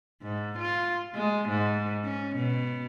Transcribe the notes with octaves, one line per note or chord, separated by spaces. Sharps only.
G#2
F4
G#3
G#2
C#4
B2